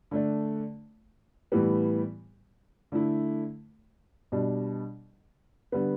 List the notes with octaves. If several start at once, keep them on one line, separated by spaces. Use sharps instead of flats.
D3 A3 D4
A2 E3 G3 B3
D3 A3 E4
B2 G3 D4
D3 G3 B3